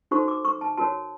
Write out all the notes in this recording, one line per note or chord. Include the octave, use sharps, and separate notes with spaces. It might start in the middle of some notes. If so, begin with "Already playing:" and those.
D#4 F#4 A4 C5 C#6
D6
C#6
A5
F#4 A#4 C#5 A5